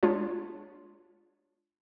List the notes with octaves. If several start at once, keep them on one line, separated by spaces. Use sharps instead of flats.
G#3 D4 F4 C#5